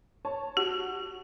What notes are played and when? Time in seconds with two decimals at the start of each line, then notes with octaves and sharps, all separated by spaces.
0.25 C#5 A5
0.57 F#4 G4